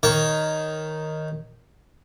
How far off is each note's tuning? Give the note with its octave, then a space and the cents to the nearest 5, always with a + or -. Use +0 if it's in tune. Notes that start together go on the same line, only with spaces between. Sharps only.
D#3 +0 C#5 -5 C#6 +30